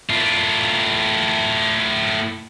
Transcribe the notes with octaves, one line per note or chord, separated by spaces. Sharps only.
A2 F4